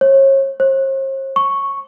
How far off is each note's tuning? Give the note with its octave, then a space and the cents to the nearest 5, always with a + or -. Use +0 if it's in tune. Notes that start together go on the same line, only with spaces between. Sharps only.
C#5 -35
C5 +45
C#6 -5